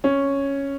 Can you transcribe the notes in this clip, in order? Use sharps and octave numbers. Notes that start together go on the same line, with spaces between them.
C#4